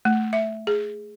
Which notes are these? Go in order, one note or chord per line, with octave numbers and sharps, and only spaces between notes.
A3
E5
G#4